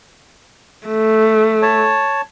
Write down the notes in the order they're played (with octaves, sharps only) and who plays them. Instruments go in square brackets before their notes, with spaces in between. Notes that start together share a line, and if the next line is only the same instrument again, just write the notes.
[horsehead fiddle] A3
[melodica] C#5 A5